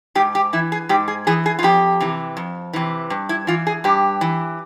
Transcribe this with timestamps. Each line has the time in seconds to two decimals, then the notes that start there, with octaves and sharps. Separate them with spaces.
0.15 G#2 G4
0.35 G4
0.53 E3 E4
0.72 G#4
0.89 G#2 G4
1.08 G#4
1.27 E3 G#4
1.46 G#4
1.59 F4
1.63 F2 G4
2.01 C3 E3
2.37 F2
2.73 C3 E3
3.10 G2
3.29 E4
3.47 E3 F4
3.67 G#4
3.84 G2 G4
4.21 E3